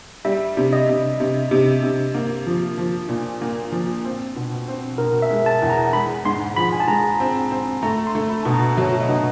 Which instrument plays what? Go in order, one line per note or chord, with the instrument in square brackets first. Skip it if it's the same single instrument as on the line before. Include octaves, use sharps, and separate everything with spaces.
[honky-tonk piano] G3 [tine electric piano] E5
[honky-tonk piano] C3
[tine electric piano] D#5
[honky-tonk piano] C3
C3
C3
C3
A#3
F3
F3
A#2
A#3
F3
C4
B2
C4
[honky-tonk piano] B2 [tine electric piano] A#4
[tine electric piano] E5
[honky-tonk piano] G#3
[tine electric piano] A5
[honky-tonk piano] E2
[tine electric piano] A#5
[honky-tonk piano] G#3 [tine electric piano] B5
[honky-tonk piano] G#2 [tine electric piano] C6
[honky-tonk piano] F3 [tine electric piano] B5
[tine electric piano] G#5
A5
[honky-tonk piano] G#3 [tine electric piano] A#5
[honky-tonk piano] C4
C4
[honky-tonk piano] A3 [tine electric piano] A#5
[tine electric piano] C6
[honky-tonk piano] A3
[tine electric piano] B5
[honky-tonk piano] B2 [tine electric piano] A5
[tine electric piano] A#5
[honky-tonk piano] F#3 [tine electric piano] E5
[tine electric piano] D#5
[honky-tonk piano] B2